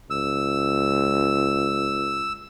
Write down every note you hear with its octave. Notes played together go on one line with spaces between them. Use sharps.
C#2 E6